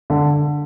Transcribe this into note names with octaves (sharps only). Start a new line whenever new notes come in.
D3